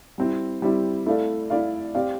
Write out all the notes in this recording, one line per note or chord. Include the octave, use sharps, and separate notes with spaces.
G3 C4 E4
G3 C4 E4
A3 E4 A4 D5 F5
A3 E4 A4 D5 F5
C4 G4 D5 F5